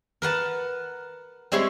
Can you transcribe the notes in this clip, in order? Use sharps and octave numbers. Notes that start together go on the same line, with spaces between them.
A#4 B4 F#5 A5
G3 G#3 C4 E4 C#5 C6